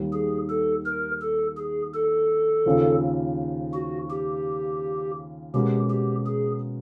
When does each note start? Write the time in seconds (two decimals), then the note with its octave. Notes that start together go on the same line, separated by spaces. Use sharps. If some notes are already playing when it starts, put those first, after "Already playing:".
Already playing: D#2 D#3 G3
0.13 G#4
0.49 A4
0.86 A#4
1.21 A4
1.57 G#4
1.94 A4
2.66 D#2 C#3 F3
3.73 F#4
4.10 G4
5.54 B2 G#3 C#4 F#4 G4 A#4
5.90 G4
6.26 G#4